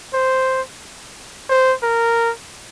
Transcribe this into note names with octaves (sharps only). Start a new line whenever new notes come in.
C5
C5
A#4